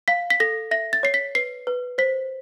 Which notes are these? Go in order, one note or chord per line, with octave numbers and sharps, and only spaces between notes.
F5 B6
B6
A4 A#6
E5 A#6
A6
C#5 C7
B6
B4 C7
B4
C5 B6